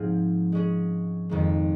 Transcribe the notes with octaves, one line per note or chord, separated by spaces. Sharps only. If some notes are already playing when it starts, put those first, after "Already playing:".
Already playing: G#2 F3 C4 F4 G#4
G#3 C#4 G#4
F2 D#3 G#3